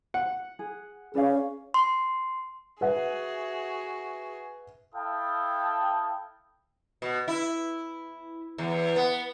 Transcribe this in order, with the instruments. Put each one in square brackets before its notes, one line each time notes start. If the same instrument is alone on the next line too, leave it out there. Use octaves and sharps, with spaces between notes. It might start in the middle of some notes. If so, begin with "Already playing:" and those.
[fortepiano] F#5
[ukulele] G#4
[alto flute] C#4 [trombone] G#4 [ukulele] B4 D5 F5
[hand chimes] C6
[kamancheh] F#4 G#4 [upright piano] B4 E5 F#5
[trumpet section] E4 A4 F5 G5 A5 D#6
[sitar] B2
E4
E2
B3